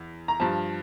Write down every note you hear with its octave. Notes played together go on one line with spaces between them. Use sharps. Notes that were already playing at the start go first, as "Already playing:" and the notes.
Already playing: E2
A#5
G2 F3 A5